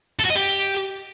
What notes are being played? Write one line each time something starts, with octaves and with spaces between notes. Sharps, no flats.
A4
F#4
D#5
G4